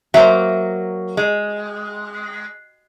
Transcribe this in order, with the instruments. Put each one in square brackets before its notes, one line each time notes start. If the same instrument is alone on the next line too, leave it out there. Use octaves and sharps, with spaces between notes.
[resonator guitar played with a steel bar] F#3 A#3 [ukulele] C5 E5
[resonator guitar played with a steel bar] G#3